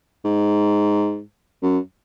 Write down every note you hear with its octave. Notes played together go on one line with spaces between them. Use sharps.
G#2
F#2